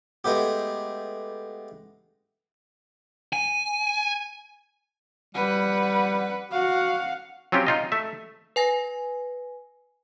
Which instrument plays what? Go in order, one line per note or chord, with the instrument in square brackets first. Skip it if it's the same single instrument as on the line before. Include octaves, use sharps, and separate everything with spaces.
[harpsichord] G#3 A3 B3 G4
[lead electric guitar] G#5
[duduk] G3 [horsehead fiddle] B4 F#5
[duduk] F#4 [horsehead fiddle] F5 F#5
[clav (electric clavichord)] F#3 C4 C#4 F4 G4
D#4 F4 D#5
A3 E5
[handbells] B4 G#5 A#6